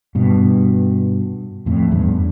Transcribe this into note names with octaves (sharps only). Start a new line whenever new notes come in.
G2 B2
F2 A2
E2 G2